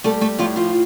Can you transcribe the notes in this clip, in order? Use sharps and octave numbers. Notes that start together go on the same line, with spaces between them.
G3 A3 A4
A3 A4
A2 F3 F4
F3 F4